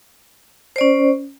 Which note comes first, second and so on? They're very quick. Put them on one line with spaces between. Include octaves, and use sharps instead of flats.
C5 D5 C#4